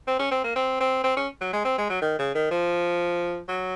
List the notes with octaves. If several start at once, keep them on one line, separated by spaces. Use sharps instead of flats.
C4
C#4
C4
A#3
C4
C4
C4
C#4
F#3
G#3
C4
G#3
F#3
D#3
C#3
D#3
F3
F#3